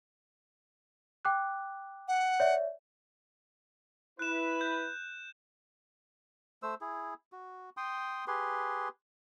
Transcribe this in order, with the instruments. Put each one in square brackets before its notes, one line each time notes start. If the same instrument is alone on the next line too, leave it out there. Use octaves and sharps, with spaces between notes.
[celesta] G5 D6 F#6
[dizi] F#5
[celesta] C#5 D5 E5
[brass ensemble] E4 B4 [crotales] F#6 E7
[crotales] G6
[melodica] A3 C5 E6
E4 G#4
F#4
G5 C6 D#6
G4 G#4 B4 C6